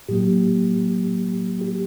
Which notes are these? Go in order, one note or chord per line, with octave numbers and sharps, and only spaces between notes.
A2 F#3 A#3 G4
G4